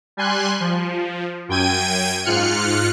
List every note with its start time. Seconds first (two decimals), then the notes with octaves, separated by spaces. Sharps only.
0.17 G3 G#5 C6 F#6
0.60 F3
1.49 F#2 G5 G#6 D#7
2.25 G#2 F4 F6 F#6 C#7